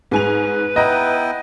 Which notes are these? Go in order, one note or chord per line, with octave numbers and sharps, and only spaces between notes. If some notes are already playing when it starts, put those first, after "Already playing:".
G#2 B4 G#5 F7
B3 E4 D#5 G5 A#5